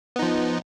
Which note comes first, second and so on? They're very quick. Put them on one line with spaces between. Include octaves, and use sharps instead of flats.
B3 D#4 F3